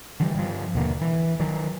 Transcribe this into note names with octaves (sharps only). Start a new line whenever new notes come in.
D3 E3 F3 G3
G2 F3
D#2 B2 D3 A#3
E3
D#3 F#3